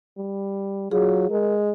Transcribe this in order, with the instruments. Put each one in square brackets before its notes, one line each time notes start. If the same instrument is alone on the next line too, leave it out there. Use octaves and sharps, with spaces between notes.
[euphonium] G3
[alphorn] F#3 [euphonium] F4 [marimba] G#4
[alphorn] G#3 [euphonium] A#4